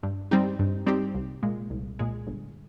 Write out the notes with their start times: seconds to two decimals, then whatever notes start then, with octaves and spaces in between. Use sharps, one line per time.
0.03 G2
0.31 G3 C4 D#4 G4
0.59 G2
0.86 G3 C4 D#4 G4
1.14 C2
1.43 A#2 G#3
1.70 C2
1.99 A#2 G#3
2.27 G1